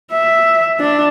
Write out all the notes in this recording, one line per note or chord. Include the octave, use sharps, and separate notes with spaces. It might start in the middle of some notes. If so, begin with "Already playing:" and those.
E5
D4